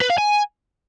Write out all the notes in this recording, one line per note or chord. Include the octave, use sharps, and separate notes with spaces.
B4
F5
G#5